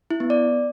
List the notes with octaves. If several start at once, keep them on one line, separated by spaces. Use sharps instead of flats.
E4
B3
D5